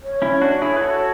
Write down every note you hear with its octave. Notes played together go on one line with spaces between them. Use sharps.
C#5
C#4 E4
D4 F#4
E4 G#4
B4
F#4 A4